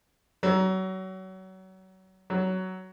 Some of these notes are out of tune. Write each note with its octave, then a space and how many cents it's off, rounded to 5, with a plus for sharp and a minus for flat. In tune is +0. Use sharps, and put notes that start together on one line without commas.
F#3 +30
F#3 +15